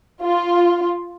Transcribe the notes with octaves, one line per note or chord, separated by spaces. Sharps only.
F4